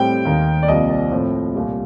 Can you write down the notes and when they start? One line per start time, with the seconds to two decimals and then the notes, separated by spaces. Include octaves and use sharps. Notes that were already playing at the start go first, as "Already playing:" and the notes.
Already playing: A2 G3 C4 G5
0.25 D#2 D#3 A#3
0.63 D5
0.68 C2 C3 F3 A#3 D#5
0.90 D5
1.11 A2 F3 C4
1.55 C2 A#2 G3